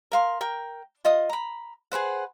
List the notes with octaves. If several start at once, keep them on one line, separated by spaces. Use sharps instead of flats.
A#4 F5 C6
A#4 G5
F4 D#5 D#6
A#5 B5
G#4 B4 C5 F#5